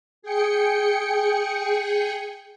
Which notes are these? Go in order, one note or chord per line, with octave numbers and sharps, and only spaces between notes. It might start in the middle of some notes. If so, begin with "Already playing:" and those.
G#4 G5 C#7